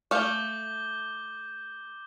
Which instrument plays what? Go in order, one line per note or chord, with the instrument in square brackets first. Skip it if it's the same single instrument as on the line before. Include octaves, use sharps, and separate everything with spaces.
[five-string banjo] A3 F5 [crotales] D6 G6 G7